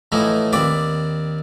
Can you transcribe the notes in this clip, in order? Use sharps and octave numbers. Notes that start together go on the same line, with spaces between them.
A2 E3 F3 A3 D#4 E4
D#2 C4 D5 B5 D6